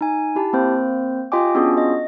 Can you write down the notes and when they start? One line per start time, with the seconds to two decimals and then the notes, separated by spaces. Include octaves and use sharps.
0.01 D#4 G#5
0.36 E4 G4 A5
0.53 A#3 C4 C5
1.32 F4 G4 D#5 G5 G#5 D6
1.55 B3 C#4 D4 F4 F#4 G#4
1.77 D#5